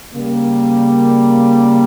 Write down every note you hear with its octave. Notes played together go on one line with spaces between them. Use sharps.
C#3 G3 A#3